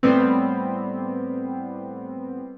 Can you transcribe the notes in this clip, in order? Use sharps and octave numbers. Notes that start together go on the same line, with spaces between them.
A2 G3 B3 C4